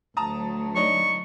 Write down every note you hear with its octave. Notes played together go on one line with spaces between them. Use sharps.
D2 F#3 A5 A#5 D#6
D4 D#4 C#5 C#6